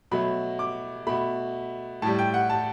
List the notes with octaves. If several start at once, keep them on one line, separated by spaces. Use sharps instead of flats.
B2 F#3 A3 B5
D6
B2 A3 B5
A2 G3 A5
G5
F#5
A5